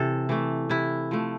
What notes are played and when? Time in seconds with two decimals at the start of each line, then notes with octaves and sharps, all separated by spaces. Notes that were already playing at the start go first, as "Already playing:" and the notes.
Already playing: C3 E3 A4
0.29 E3 A3
0.70 C3 E4
1.11 F3 A3